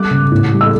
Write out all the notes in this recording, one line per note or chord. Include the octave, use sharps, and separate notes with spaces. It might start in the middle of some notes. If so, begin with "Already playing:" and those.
Already playing: G3 D6 F#6
C#3
A2
G3
E6